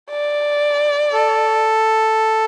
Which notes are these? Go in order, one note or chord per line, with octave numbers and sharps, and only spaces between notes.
D5
A4